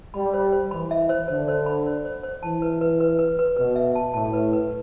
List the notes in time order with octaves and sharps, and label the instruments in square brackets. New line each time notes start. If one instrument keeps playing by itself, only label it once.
[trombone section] G3 [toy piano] B5
[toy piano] C5
C5
[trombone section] E3 [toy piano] B5
[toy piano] E5
C5
[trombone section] D3 [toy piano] C5
[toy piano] C5
B5
C5
C5
C5
[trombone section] E3 [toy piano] A5
[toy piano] B4
B4
B4
B4
B4
[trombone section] B2 [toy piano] B4
[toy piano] E5
A5
[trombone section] A2 [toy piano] A5
[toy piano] B4
B4